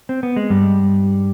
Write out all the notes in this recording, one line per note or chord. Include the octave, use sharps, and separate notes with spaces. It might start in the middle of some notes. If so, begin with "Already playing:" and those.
C4
B3
G#3
G2 G3